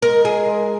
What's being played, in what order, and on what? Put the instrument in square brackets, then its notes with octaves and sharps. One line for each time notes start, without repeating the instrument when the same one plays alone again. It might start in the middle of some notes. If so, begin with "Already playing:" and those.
[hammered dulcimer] G#3 [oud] A#4
[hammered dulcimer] D#4 A#4 [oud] G#4
[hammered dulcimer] G#3